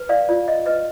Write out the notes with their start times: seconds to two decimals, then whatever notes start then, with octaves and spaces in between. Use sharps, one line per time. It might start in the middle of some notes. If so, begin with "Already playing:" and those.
Already playing: B4
0.09 D5 F5
0.28 F4 D5
0.48 D#5
0.66 B4 D#5